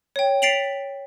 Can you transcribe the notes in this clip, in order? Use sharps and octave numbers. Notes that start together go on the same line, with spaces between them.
C#5 G5
A6 B6 C7 D7 F7 F#7